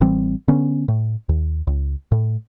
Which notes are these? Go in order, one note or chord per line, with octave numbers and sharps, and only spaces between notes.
A1 E3 G3 C4
D3 B3 C#4
A2
D#2
C#2
A2